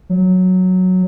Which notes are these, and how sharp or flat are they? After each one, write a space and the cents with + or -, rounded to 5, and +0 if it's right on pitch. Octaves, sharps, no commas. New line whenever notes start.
F#3 -5